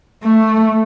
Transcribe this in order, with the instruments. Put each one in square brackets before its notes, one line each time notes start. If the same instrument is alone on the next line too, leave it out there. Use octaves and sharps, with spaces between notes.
[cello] A3